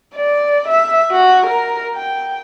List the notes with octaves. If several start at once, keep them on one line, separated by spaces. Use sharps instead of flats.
D5
E5
F#4
A#4
G5